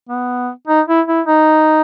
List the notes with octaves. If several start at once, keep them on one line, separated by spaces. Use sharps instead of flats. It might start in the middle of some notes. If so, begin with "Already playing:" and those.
B3
D#4
E4
E4
D#4